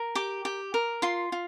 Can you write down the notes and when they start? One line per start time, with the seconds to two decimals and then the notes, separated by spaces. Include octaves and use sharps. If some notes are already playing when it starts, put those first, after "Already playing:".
Already playing: A#4
0.15 G4 D6
0.45 G4
0.74 A#4
1.02 F4 C6
1.32 F4